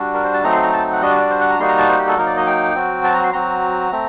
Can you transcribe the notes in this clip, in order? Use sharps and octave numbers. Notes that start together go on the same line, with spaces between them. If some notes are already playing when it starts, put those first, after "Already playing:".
Already playing: G3 D4 F#4
A#4
C5
A5
F#3 A3 C4 D#4 A#5
C6
A#5
A5
F#5
G3 D4 F#4 D#5
D5
D5
C5
F#5
A#5
G3 A#3 D#4 F#4 C6
A#5
A5
C5
G4
A4
F#3 A#3 D#4 A#4
D5
D#5
G5
F#3 C4 F#4
A5
A#5
C6
F#3 C4 F#4 A#5
A3 C4